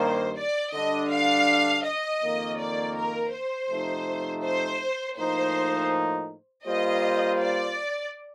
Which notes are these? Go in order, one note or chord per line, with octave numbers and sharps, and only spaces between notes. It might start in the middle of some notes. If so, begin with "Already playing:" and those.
Already playing: G2 D#3 G3 A#3 C5
D5
D3 G3 D4 D#5
F5
D#5
F2 D#3 A#3
D5
A#4
C5
C3 F3 A3 D#4
C5
A2 F3 A#3 D#4 C5
G3 A#3 F4 C5 D#5
D5